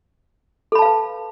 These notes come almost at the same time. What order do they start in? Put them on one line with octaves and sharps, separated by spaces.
A4 B5 A5 F5 B4